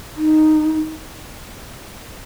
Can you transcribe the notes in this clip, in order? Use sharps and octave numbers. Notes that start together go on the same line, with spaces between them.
D#4